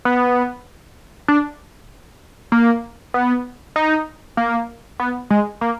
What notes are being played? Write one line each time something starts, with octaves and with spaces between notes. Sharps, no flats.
B3
D4
A#3
B3
D#4
A#3
B3
G#3
A#3